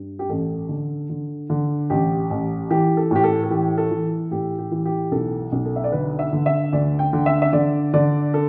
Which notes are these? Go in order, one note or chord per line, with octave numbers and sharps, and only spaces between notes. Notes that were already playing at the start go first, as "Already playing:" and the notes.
Already playing: G2
G4
A1 A4
D3
D3
D3
A1 G4
A1
E3 G4
A4
A2 G4
A4
A4
E3 G4
A4
E3
A2 G4
G4
E3
G4
B1 A4
B1
A4
E5
D5
D3 B4
E5
D3
E5
D2 D5
G5
D3
E5
E5
D3 D5
D3 D5
A4